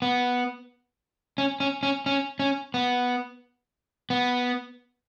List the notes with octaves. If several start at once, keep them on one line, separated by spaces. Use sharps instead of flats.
B3
C#4
C#4
C#4
C#4
C#4
B3
B3